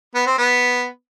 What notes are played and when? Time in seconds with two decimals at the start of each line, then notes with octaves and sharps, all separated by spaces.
0.15 B3
0.27 C4
0.38 B3